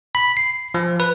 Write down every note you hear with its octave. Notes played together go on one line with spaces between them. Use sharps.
B5
C7
F3
B4